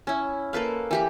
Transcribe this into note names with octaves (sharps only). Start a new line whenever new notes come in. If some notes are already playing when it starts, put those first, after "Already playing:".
C#4 E4
A#3 A4 B4 F5
E3 G4 B5